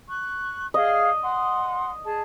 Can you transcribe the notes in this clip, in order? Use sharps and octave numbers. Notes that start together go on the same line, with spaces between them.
C#6 F#6
G#4 D#5 F5
F#5 C6
G#4 A5